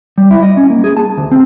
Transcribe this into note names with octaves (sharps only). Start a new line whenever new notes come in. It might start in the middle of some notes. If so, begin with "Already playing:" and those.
G3
E4
D#5
C#4
A#3
G#4
A5
D2
C4